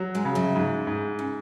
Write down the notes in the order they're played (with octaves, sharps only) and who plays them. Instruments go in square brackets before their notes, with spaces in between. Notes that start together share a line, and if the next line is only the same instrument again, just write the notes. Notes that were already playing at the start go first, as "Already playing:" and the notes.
Already playing: [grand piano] F#3
[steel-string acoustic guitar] G#2 G#3
[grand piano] C#3
[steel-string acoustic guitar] F#2 F#3
[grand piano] G#2
G#2
[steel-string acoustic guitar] C#3